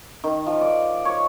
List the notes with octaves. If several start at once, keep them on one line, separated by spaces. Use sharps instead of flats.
D#3
F3
D5
C#5